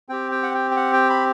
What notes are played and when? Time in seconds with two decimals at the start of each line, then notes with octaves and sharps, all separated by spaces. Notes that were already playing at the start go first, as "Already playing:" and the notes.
0.09 C4 G4 G5
0.32 G5
0.43 F#5
0.54 G5
0.71 G5
0.76 F#5
0.93 G5
1.10 B5